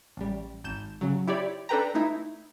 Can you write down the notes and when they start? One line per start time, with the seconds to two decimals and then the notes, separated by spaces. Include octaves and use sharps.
0.17 A1 G3
0.64 G#1 G6 E7
1.01 C#3 F#3
1.28 E4 G4 C#5 D5 B5
1.69 D4 A4 B4 G5 A#5
1.94 A3 D#4 E4